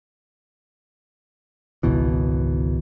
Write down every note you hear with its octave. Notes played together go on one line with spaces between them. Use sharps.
G#1 C#2 B2 E3